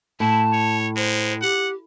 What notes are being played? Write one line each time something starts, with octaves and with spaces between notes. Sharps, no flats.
A2 E4 A5
C#5
G#3 C5
G4 F#5